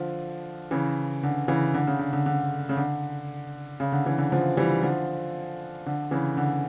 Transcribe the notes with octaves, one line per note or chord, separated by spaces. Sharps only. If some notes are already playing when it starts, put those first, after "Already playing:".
Already playing: D3 F3
C#3 E3
D3
C#3 E3
D3
C#3
D3
D3
D3
C#3
D3
C#3
D3
C#3 E3
D3
D3 F3
E3 G3
D3 F3
D3
C#3 E3
D3